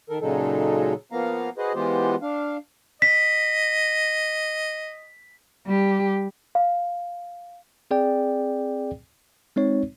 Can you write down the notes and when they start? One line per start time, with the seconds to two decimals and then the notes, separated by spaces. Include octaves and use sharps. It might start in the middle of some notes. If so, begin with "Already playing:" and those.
0.09 D#3 A4 A#4
0.21 A#2 C#3 F#3 G#3 D#4 A4
1.12 F3 A#3 B3 F5 A#5
1.58 F#4 G#4 B4 C5 D#5
1.75 E3 G#3 B3 F4 G4 C5
2.22 D4 F5
3.02 D#5 B6
5.66 G3 G4
6.55 F5
7.91 C4 G#4 D5 G5
9.56 G#3 C4 D#4 C#5